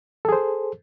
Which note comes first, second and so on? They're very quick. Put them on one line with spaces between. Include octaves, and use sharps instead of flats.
A4 G#4 C5